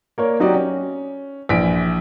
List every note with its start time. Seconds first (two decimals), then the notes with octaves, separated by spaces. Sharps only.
0.18 A#3 A#4 C#5 D5
0.40 F#3 C4 D#4 F#4 G4 D5
0.54 C#4
1.49 A#1 E3 B6 D7